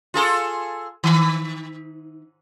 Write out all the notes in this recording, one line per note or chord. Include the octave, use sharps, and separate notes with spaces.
F4 G#4 A4
D#3